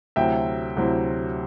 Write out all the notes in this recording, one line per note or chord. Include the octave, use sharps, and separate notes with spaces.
D2 C3 F#3 C4 E4 E5 G5
D2 C3 F#3 C4 E4